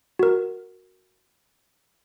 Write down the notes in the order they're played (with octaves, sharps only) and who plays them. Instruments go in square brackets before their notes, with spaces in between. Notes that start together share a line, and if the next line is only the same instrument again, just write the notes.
[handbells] F#4 A#4